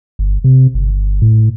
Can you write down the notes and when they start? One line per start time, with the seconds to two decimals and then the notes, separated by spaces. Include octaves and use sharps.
0.19 G1
0.44 C3
0.75 G1
1.22 A2